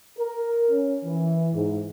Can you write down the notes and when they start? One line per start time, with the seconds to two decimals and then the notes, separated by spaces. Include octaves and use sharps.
0.18 A#4
0.70 C#4
1.04 E3
1.54 G#2